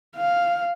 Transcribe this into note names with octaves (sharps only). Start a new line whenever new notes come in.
F5